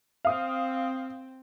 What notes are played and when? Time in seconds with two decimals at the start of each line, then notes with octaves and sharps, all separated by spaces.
0.25 C4 F5 D#6